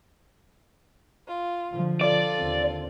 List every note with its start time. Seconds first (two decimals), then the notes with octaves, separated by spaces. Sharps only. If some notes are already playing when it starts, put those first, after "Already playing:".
1.26 F4
1.71 D3 F3
2.01 F4 A4 D5
2.37 D#2 D3 C4